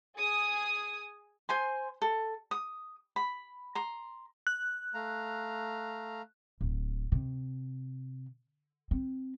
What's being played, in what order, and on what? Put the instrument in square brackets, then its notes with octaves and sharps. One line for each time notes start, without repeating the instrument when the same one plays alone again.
[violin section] G#4 G#5 D#6
[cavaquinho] C5 G#5 C6
A4
D#6
B5
A#5 C6
[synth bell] F#6
[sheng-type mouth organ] A3 F5 A#5
[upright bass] D1
C3
C4